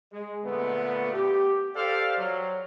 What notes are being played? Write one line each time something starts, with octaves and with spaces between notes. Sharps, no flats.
G#3
A#2 D3 A3 B3
G4
G4 A4 C5 D5 F5
F#3